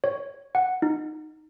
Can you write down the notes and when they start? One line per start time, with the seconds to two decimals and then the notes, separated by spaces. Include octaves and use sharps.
0.04 C#5
0.55 F#5
0.82 D#4